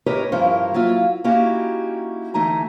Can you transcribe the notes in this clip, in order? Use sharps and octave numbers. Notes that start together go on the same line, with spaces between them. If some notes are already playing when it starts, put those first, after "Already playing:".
A2 G4 A#4 B4 C#5 D#5
G2 F3 C#4 E4 A#4 C5
F#3 A#3 E4 F4
A#3 C#4 D#4 E4 F#4 G4
D2 E3 A3 D#4 A#5